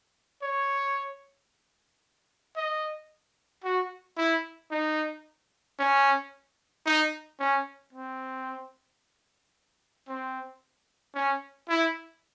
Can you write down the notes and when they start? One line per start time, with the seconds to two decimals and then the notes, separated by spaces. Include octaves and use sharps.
0.42 C#5
2.57 D#5
3.64 F#4
4.18 E4
4.71 D#4
5.79 C#4
6.86 D#4
7.40 C#4
7.93 C4
10.08 C4
11.15 C#4
11.69 E4